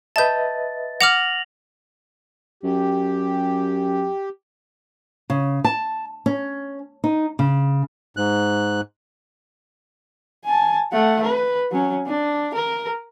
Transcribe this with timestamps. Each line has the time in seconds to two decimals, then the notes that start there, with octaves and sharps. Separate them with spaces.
0.16 B4 D#5 E5 A5 G6 A6
1.01 F#5 D6 F6 A#6 F7 F#7
2.63 F#2 G4
5.30 C#3
5.64 A5
6.26 C#4
7.04 D#4
7.39 C#3
8.17 G#2 F#6
10.45 G#5 A5
10.92 A3 F#5
11.23 B4
11.71 F#3 C#4
12.06 D4
12.54 A#4